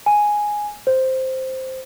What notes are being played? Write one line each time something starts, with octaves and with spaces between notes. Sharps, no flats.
G#5
C5